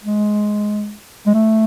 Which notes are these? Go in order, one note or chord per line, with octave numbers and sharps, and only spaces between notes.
G#3
G#3
A3